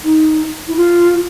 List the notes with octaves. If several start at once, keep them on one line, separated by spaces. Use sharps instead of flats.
D#4
E4
F4